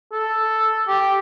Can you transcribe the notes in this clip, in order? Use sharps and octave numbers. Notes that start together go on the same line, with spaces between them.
A4
G4